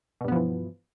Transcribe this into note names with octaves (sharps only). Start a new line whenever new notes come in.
G2 B2 E3 F3 B3